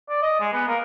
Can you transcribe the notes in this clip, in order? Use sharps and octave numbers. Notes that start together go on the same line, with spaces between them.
D5
D#5
G#3
B3
A#3